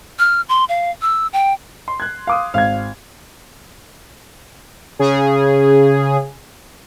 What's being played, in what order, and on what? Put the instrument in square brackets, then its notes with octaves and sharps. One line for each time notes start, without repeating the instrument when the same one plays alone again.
[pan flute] F6
C6
F5
E6
G5
[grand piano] C6
[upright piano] F#6 G#6
F5 D6 D#6
[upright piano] G#1 G#6 [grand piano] F5
[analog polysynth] C#3 G#4